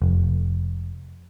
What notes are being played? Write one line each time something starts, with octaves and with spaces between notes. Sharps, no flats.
F1